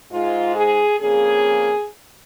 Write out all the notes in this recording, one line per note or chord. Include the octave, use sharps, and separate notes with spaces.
G#2 G#3 F4
G#4
F2 C#3 A#3 G#4